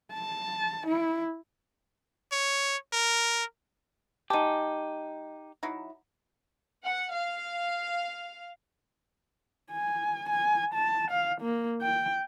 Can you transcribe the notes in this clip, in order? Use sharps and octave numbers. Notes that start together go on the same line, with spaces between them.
A5
E4
C#5
A#4
G#3 D#4 G4 A5
F#3 D#4 E4
F#5
F5
G#5
G#5
A5
F5
A#3
G5